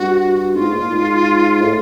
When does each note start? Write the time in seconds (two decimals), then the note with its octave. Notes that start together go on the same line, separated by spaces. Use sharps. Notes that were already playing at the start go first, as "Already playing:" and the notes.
Already playing: G2 F#4
0.55 G#2 F4
0.73 A#2
0.91 G#2
1.61 A2